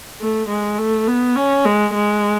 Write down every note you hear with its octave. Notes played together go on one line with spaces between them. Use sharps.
A3
G#3
A3
B3
C#4
G#3
G#3